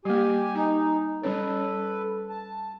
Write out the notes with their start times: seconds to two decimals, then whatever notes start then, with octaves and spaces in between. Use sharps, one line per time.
0.05 G3 A#3 G4 G#5
0.55 D#4 G#5
1.23 G3 C#4 A4 B4 C#5
2.30 A5